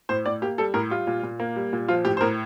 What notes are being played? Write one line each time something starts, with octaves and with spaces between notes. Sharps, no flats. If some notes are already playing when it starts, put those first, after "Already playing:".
A2 C5
A2 D5
A#3 G4
G3 A4
A2 A#4
G3 F4
A#2
A#2
A#3
G3
A#2
F3 F4
A2 G4
C5
A2 A#4